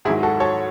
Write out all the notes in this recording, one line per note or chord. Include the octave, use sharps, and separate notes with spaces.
G#2 D#3 F#3 E4 G#4
F#4 A4
A4 C#5